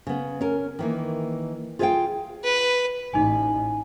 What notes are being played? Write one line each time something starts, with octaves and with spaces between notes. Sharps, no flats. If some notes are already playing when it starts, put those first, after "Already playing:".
C#3 B3
C#4 A#4
D#3 E3 A#3
F4 G#4 C5 E5 F5 G5
B4
A1 D#4 G#5